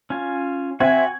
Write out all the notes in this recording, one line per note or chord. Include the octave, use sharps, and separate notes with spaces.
C#4 F4 G#5
C4 F#4 E5 G#5 G#6